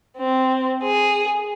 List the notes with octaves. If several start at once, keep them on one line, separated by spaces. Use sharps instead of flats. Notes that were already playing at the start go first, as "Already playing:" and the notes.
C4
G#4